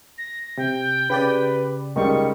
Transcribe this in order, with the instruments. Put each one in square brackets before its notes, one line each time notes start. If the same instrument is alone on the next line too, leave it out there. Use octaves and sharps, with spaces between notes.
[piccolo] A#6
[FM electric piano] C3 [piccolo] G5
[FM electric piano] C#3 G4 D5 [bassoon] B4
[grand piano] C#2 G3 [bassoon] D#3 [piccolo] C#6